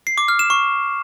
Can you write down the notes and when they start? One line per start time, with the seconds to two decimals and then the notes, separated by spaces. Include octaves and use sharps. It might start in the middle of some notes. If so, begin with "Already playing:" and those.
0.07 C7
0.18 D6
0.28 F6
0.39 E7
0.50 C#6